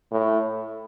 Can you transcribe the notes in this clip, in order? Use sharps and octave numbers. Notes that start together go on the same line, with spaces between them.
A2